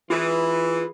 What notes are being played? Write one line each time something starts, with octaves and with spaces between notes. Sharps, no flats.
E3 F4 G#4 B4